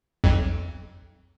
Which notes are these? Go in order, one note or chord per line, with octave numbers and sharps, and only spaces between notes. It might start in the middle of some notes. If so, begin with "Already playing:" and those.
B1 F2